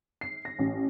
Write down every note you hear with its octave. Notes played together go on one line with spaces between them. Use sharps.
C7
A#6
A1